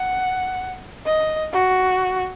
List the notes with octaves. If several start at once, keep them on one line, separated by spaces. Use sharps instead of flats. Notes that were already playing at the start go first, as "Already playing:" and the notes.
Already playing: F#5
D#5
F#4